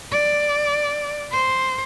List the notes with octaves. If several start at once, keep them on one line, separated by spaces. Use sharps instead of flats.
D5
C5